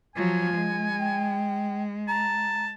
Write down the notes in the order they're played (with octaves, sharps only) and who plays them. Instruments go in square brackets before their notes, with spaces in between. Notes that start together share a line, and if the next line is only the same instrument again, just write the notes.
[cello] F3 F#3 [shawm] G#5
[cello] G#3
[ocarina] G5
[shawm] A5 [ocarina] A#5